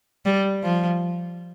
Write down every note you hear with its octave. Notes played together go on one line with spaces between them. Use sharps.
G3
F3